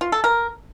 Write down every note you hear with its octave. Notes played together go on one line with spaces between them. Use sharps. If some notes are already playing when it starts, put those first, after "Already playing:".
F4
A4
A#4